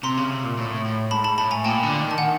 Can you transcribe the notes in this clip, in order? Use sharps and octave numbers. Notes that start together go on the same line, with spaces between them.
C3 A#5 C6
C#3
C3
A#2
A2
A2
G#2 A5 B5
A5 B5
A2 A5 B5
G#5 A#5
A#2 G5 A5
D3
D#3
A5
D#3 F#5 G#5